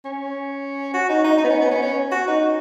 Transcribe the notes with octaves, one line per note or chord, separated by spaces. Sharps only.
C#4
F#4
D#4
D#4
D#4
B3
C#4
B3
C#4
C#4
F#4
D#4